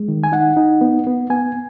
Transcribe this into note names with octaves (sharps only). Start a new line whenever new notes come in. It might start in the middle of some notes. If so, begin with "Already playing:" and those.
Already playing: G#3
D#3
G#5
D#4 F#5
D#4
B3
B3
B3 G#5